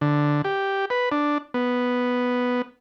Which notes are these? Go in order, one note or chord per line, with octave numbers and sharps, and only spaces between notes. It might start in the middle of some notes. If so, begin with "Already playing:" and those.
D3
G4
B4
D4
B3